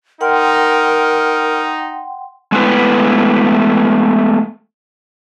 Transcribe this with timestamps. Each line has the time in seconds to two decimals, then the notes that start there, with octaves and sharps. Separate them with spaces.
0.21 D#4 A#4 F#5 G5 C6
2.52 G#3 A3 B3 D#4 E4 B4